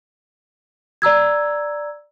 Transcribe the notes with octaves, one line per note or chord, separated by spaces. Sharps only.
D5 A#5 E6 G#6